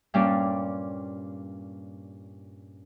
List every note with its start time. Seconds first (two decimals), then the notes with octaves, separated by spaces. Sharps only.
0.14 G2 A#2 G3 C#4 D5